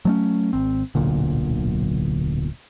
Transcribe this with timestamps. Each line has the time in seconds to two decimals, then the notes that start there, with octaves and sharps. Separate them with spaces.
0.05 F#3 A3 C#4
0.53 G#1 C4
0.95 D1 B1 A#2 D3